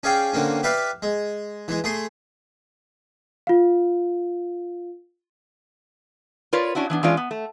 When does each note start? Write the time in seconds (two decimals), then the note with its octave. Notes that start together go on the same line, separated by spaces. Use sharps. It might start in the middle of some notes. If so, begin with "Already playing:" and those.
0.03 C#4 G#4 D5 F5 G5 G#5
0.33 D3 A#3 C4 C#4
0.63 G4 B4 D5 E5 F5
1.02 G#3
1.68 E3 G#3
1.84 A3 G#4 C6
3.47 F4 F5
6.53 F4 A#4 B4 C#5 D5
6.75 C#4 D4 E4 F#4
6.90 E3 B3 D4
7.03 E3 G#3 C#4 D4 F4 D5
7.17 B3
7.31 A3